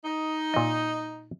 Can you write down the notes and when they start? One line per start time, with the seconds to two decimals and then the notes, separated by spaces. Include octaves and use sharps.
0.05 D#4
0.54 A#2 D#5